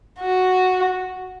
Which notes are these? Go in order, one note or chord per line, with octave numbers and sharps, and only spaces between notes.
F#4